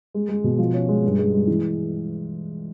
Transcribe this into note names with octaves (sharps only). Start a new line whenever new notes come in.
G#3
G#3
B2
F3
C#4
G#3
G2
G#3
G#3
E3